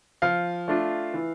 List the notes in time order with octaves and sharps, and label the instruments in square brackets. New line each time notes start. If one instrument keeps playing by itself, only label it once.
[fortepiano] F3 [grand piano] F5
[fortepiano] A3 D4 F4
E3